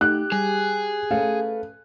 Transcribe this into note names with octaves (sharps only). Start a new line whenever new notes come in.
A3 D#4 G4 F#6
G3 G#4
A3 C#4 B4 F5